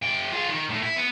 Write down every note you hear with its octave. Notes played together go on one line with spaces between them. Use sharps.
F#2 G5
F4 G#4
D#3
A2
E4
B3